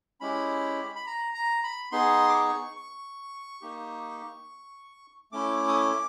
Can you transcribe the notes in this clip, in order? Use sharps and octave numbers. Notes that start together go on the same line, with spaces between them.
G#3 C#4 E4 G4 B5
B5
A#5
A#5
B5
B3 D#4 G#4 C6
D6
C#6
C#6
A#3 D#4 G4
A3 C#4 E4 D6
D#6
D6